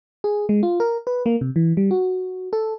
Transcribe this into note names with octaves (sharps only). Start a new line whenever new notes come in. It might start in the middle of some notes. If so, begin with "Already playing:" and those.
G#4
G#3
F4
A#4
B4
A#3
C3
E3
G3
F#4
A4